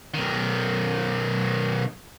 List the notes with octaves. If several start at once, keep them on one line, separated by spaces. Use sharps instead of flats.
B1 D#3